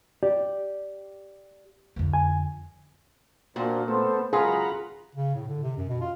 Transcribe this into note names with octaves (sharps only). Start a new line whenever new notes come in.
G4 D5
F2 D3
G#5
A#2 A#3 C4 D4 F4 F#4
A3 B3 C4 A4 C5
C#2 F#2 F4 G#4 F#5 A#5 B5
C#3
A2
D3
C3
F#2
B2
F4